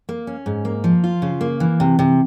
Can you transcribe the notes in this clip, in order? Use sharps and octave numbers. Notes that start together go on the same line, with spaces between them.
A#3
C#4
G#2
A#3
F3
F4
C#3
A#3
E3
C3
C3